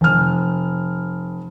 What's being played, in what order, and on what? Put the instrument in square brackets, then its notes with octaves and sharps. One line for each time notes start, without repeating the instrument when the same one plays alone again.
[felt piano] F1 F6